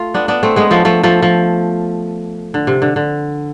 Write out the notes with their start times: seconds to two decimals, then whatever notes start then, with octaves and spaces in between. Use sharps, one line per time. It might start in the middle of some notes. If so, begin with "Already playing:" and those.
Already playing: A3 F4
0.14 B3 D4
0.28 B3 D4
0.43 A3 C4
0.56 G#3 B3
0.71 F3 A3
0.85 F3 A3
1.03 F3 A3
1.22 F3
2.54 D3
2.67 C3
2.82 D3
2.96 D3